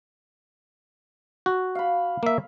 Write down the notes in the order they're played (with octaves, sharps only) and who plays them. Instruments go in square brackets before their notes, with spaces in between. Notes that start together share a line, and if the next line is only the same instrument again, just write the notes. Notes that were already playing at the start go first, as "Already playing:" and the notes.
[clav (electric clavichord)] F#4
[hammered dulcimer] F5 B5
[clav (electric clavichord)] A#3 E5